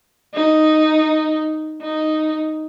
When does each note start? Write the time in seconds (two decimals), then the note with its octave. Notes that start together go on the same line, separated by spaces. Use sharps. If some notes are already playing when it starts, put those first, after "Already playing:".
0.35 D#4
1.82 D#4